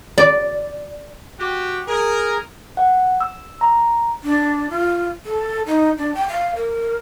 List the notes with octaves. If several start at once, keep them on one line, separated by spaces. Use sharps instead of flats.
D5
F#4 G4
G#4 A#4
F#5
E6
A#5
D4
F4
A4
D#4
D4
G5
F5
A#4